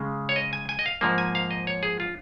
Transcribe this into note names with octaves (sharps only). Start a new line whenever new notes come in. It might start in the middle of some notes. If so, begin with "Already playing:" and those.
Already playing: C#3 G#3
C#5
D#5
G#5
G#5
D#5
F5
G#2 F3 A#3
G#5
F5
D#5
C#5
G#4
F4